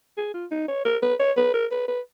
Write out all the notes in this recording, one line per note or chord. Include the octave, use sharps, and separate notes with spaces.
G#4
F4
D#4
C#5
A#4
B4
C#5
B4
A#4
B4
B4